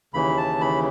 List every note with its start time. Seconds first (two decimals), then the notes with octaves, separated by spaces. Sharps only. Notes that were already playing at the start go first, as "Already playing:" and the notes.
0.14 D#2 C#3 E3 B5
0.37 A5
0.61 B5